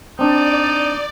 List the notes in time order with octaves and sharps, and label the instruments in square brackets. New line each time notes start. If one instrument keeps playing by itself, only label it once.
[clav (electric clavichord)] C4 D4 [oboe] D#4 [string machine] D5